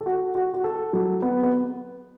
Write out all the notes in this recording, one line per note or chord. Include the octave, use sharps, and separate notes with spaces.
A4
F#4
F#4
F#4
A4
F#3
B3
B3